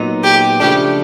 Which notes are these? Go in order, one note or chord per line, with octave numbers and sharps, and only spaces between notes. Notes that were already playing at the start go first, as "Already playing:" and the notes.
Already playing: A#2 F#3 B3 D#4
G4
C#3 F3 A3 D4 G4